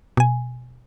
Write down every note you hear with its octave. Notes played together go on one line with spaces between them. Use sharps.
B2 G#5